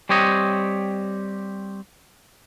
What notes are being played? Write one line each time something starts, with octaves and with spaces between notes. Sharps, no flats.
G3 C4 G4 C#5 D#5